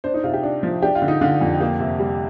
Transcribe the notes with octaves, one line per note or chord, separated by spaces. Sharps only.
D4 C5
D#4
C3 F4
G4
D4
F3
D4 G4
F4
D3
D#4
D3 F4
F2
A#3 G4
C3
G3